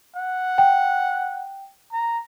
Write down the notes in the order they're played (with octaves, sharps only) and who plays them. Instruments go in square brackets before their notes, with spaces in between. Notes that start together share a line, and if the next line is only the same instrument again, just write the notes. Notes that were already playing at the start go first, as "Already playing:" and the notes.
[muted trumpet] F#5
[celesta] G5
[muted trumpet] A#5